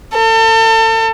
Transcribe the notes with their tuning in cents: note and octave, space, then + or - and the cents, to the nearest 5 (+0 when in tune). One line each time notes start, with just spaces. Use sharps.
A4 +35